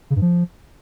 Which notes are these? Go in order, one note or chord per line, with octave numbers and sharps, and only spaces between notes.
C#3
G2
F3